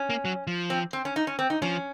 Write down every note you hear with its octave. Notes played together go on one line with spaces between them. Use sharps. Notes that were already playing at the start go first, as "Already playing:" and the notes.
Already playing: C#4
A#3
F#3
F3
C4
C4
C#4
D#4
C#4
C4
D#4
F3 C#4